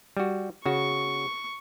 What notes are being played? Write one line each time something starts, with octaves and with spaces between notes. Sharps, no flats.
G3 F#4
C#3 F#4 C#6